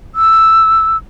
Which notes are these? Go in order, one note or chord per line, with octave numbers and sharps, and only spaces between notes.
E6